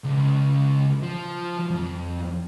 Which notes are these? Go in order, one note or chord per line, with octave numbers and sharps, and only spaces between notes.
C#2
F3
F2